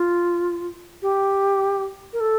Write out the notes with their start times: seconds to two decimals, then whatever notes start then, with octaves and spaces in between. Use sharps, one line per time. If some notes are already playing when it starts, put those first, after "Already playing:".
Already playing: F4
1.02 G4
2.13 A#4
2.20 A4